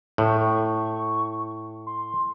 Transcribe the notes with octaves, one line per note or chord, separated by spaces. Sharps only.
A2 C#6
C6